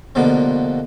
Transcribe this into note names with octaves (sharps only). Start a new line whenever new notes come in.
C2 B2 D3 F3 A#3